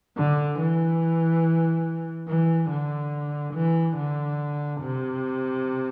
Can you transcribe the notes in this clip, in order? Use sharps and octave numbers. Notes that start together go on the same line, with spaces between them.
D3
E3
E3
D3
E3
D3
C3